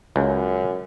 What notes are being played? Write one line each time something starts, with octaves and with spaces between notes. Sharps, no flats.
C#2 F#2